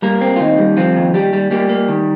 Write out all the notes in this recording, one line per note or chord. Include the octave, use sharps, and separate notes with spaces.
G3 A#3 A#4
C4
F4
D#2 D#4
G3
F3 C4 F4
D#2
D#2 G3 G4
G3
G3 A#3 G4
A#3
D#3